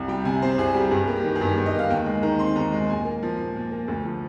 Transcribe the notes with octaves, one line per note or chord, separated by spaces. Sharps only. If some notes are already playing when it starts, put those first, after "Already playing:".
Already playing: C2
G3 G5
C3 G#5
C4 C5
C2 G#4
G3 G4
G2 G#4
A#3
G4
D#3
G#4
G2 G4
G2
D#5
A#3 F5
D#2 G5
G#3
D#3 A#5
C4 C6
D#2 A#5
G#3
A#2 G#5
A#3
F3
A#2
A#2
A#3
D2
F3